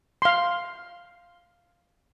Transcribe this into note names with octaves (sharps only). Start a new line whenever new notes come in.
F5 C6